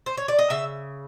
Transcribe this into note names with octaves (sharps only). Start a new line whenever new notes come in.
C5
C#5
D5
D#5
C#3 E5